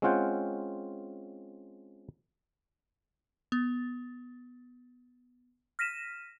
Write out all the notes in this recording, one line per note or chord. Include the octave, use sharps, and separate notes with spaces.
G#3 C4 C#4 F4 F#5 G5
B3
F6 A#6 B6 D#7 E7